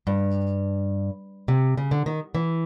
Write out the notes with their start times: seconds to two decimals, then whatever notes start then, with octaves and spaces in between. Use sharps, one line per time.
0.07 G2
1.48 C3
1.77 C#3
1.91 D3
2.06 D#3
2.35 E3